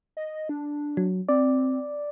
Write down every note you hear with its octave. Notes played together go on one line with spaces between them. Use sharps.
D#5
D4
F#3
C4 D5